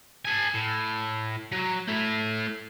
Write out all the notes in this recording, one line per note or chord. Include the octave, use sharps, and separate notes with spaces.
A4 G#5
A2
F#3
A3 E4